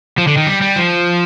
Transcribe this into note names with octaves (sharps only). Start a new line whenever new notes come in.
F3
D3
D#3
G3
G3
F3